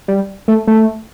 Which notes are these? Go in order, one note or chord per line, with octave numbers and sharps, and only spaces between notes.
G3
A3
A3